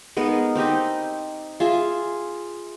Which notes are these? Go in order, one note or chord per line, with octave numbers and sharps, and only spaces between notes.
G#3 B3 D#4 A#4
C4 D#4 G4 D#5
F4 G#4 E5